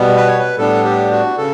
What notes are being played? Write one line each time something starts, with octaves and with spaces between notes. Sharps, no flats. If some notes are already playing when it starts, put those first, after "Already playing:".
Already playing: B2 G3 B3
B4
C#5
B4
A2 G3 B3 D4 A4
G4
F#4
C#3 A4